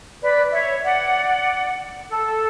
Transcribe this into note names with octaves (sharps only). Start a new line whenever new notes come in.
B4 D5
C#5 E5
D5 F#5
A4